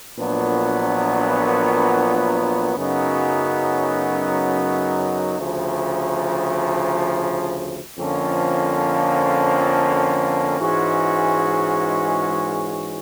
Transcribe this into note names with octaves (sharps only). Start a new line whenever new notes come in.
A#1 A#2 F#3 B3 D4
F#2 C#3 F#3 B3 D#4
D2 C#3 F3
F2 D3 F3 A#3 C#4
G#2 E3 G#3 C#4 F#4